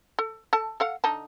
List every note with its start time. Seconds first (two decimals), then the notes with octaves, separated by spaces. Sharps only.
0.19 A4
0.53 A4 A5
0.80 A4 F5 F#5
1.04 D3 D#4 A5